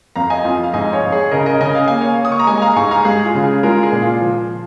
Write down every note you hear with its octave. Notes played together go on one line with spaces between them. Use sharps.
F2 F5 A#5
D#5 G#5
F2 F4
F5
G#2 D#5 G#5
C#5 F5
G#2
G#4 C#5
C#3 A#4 D#5
A#4 D#5
C#3 D#5 G#5
F5
A#3 G#5
C#5 F5
A#3
D#6
C#6
A#5
G#3 D#5 G#5
G#5
F5 A#5
G#2 G#5 C#6
F5 A#5
G#3 G#4
F4
C#3
G#4
G#3 F4 A#4
G#4
A#2
F4
F3